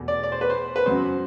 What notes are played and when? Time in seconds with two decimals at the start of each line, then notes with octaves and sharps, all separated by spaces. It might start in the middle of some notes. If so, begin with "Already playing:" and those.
Already playing: E2 B2 A3
0.08 D5
0.23 D5
0.32 C5
0.41 B4
0.50 C5
0.76 B4
0.86 F#2 F#3 B3 C5